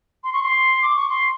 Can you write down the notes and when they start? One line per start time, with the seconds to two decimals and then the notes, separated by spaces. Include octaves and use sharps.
0.24 C6
0.33 C#6
0.43 C6
0.82 D6
0.96 C#6
1.10 C6